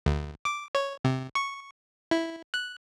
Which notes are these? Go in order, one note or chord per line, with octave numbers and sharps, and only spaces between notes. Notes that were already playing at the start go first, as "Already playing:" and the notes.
D2
D6
C#5
C3
C#6
E4
F#6